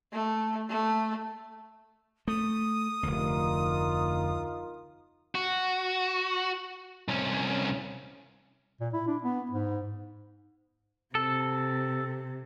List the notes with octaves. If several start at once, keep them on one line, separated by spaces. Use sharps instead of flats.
A3
A3
A3 D#6
F1 D2 D#4 F4 A#4
F#4
C2 C#4
A#2
E4
D4
B3
G#2
C3 A4